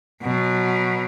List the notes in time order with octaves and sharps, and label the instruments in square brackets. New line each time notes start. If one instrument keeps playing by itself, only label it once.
[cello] B2 F#3